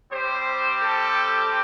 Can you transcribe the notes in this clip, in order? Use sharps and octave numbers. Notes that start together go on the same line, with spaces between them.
G3 C4 G4 C5
A4